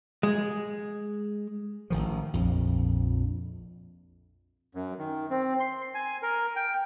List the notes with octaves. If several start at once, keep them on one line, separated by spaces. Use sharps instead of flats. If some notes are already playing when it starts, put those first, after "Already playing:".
G#3
A1 D#3 F3
A#1 F2
F#2
D#3
C4
C6
G#5
A#4
G5